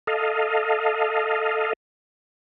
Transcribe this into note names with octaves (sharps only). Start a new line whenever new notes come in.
A4 D#5 F5